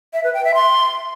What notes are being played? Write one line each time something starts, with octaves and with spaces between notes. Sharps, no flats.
E5
B4
G5
E5
C6